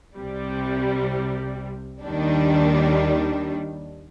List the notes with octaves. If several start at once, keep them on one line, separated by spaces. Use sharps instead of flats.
C2 C3 G3
D#2 D#3 G3 D4